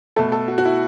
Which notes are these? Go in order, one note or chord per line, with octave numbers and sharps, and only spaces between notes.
B2 A3 A4
A4
F#4
F#4
E4